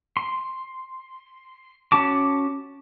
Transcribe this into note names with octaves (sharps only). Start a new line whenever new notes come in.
C6
C#4 F#4 A5 D6